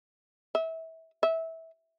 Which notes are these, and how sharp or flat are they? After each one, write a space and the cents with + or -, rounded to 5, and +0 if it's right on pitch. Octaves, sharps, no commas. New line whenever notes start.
E5 -25
E5 -20